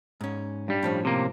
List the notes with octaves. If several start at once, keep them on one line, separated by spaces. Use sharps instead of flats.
G#2 C#4
G2 G3
A2 F3 C#4
C3 A#3